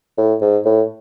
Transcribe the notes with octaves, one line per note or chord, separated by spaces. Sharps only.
A2
G#2
A2